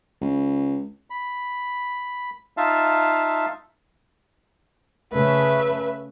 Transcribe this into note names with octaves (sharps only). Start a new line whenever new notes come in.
C#2
B5
D#4 F4 E5 F5 A5
C#3 A3 B4 E5